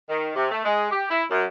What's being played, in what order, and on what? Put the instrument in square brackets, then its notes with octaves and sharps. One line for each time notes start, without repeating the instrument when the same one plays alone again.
[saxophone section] D#3
C3
A3
G#3
G4
E4
F#2